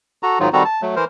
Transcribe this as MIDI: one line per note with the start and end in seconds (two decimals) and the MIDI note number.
0.23 0.39 66
0.23 0.39 69
0.23 0.39 82
0.40 0.49 44
0.40 0.49 51
0.40 0.49 54
0.40 0.49 63
0.40 0.49 65
0.53 0.63 51
0.53 0.63 55
0.53 0.63 60
0.53 0.63 66
0.53 0.63 69
0.53 0.63 82
0.65 0.81 81
0.82 0.95 54
0.82 0.95 57
0.96 1.05 52
0.96 1.05 70
0.96 1.05 72